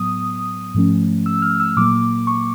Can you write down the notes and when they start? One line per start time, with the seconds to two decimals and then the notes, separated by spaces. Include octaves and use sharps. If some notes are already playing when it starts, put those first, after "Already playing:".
Already playing: A2 F#3 B3 D#6
0.74 G#2 F3 A3 C#4
1.26 E6
1.42 F6
1.60 E6
1.77 A#2 F#3 A#3 D6
2.27 C#6